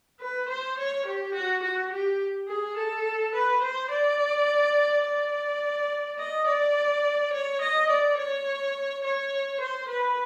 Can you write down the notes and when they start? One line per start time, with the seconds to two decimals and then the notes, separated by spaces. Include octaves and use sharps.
0.20 B4
0.49 C5
0.78 C#5
1.06 G4
1.34 F#4
1.63 F#4
1.92 G4
2.48 G#4
2.77 A4
3.35 B4
3.63 C5
3.90 D5
5.05 D5
6.19 D#5
6.47 D5
7.33 C#5
7.62 D#5
7.90 D5
8.18 C#5
9.04 C#5
9.61 C5
9.89 B4